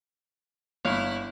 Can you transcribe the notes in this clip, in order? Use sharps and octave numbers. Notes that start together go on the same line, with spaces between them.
G1 E4 C#5 F5